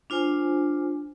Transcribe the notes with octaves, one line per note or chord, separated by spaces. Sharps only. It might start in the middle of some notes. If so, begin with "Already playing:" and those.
D4 F4 C5 G#5